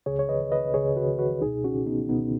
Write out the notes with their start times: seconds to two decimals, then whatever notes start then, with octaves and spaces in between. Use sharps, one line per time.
0.06 C#2 C#3 G#4 C#5
0.19 C#5
0.29 B4 D#5
0.52 B4 D#5
0.74 C#2 C#3 G#4 C#5
0.96 F#4 B4
1.19 F#4 B4
1.41 C#2 B2 D#4 G#4
1.64 C#4 F#4
1.86 B3 D#4
2.09 C#2 B2 B3 D#4